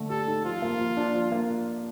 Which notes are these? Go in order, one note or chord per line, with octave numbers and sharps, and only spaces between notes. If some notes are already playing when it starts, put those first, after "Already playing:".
Already playing: D3 A3
G4 A4
D#4
F3 F4
A#3
F3
D4
F3
A#3